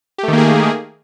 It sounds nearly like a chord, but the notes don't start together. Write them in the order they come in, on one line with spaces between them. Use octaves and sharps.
G4 A3 D#3 A#3 G#4